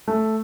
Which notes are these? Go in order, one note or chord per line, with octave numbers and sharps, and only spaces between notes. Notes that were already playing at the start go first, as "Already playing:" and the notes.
A3